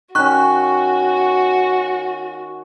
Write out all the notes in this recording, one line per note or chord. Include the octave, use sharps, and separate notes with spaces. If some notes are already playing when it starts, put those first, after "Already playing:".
D#3 C#4 F#4 C#6 F#6